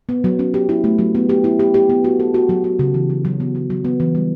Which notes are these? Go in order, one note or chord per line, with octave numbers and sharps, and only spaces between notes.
B3
F#3
C#4
G4
E4
A3
F#3
B3
G4
E4
G4
G4
B3
F#4
A4
F#4
F#3
F#4
C#3
E3
F#3
F#3
B3
B3
F#3
B3
E3
G3